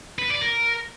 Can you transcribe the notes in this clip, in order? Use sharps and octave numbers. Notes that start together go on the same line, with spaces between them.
B4
D5
A#4